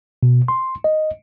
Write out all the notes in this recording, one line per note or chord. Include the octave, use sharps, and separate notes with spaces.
B2
C6
D#5